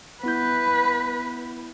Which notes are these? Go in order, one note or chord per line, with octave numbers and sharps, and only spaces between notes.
B3 E4 B4 G6